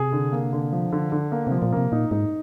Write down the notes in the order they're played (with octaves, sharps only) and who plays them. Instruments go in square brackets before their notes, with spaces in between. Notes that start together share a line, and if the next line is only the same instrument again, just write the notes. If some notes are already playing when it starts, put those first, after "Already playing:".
Already playing: [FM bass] C3 [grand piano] G#4
[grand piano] D3
A#3
D3
F3
D3
D3
A#3
[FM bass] C3 [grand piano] F3
[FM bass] A#2
[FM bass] C3 [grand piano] A#3
[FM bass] A#2 [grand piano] D#4
[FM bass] G#2 [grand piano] D#4